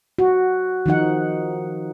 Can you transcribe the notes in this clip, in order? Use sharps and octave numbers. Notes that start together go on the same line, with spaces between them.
F#4
D#3 F3 D#4 F#5